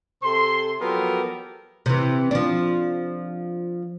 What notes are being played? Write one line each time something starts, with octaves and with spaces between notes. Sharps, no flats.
C3 A4 C5 C6
F3 F#3 B3 G4 A4 A#4
C3 E3
F3 D4